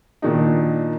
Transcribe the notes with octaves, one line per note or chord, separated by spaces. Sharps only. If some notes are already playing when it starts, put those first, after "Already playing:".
A#2 D#3 D4 D#4